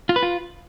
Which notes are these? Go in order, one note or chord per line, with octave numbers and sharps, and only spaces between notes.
F4
B4
F4